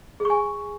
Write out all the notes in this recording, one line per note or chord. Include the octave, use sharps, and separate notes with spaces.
G#4
C#6
G#5